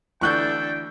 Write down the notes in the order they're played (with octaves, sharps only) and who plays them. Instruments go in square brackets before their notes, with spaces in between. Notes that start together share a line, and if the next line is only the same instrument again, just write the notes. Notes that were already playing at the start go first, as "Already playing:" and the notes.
[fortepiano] D2 E3 [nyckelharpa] D4 A4 [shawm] G5 [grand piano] C#6 F#6 G6